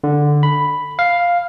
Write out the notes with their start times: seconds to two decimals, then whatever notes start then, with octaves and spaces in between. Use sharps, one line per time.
0.04 D3
0.43 B5
0.99 F5